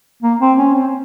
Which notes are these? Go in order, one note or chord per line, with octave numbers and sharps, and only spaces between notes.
A#3
C4
C#4
C4